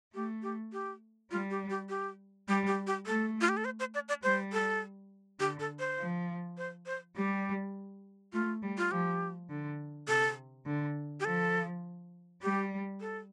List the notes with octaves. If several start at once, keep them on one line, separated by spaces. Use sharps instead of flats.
A3 G4
G4
G4
G3 F4
G4
G4
G4
G3 G4
G4
G4
A3 A4
F4
G4
A4
C5
C5
D5
D5
G3 C5
A4
D3 G4
A4
C5
F3
C5
C5
G3 G4
A3 F4
G3
F4
F3 G4
D3
C3 A4
D3
G4
F3 A4
G3 G4
A4